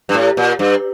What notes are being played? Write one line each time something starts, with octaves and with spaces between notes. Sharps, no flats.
G2
A2
A#2
G2